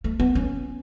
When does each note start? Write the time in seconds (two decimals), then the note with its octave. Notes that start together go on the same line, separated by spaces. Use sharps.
0.04 A3
0.20 B3
0.35 C#4